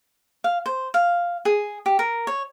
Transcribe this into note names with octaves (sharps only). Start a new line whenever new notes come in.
F5
C5
F5
G#4
G4
A#4
C#5